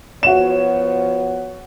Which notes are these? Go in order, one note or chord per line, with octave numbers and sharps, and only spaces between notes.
F3 B3 F#4 C#5 E7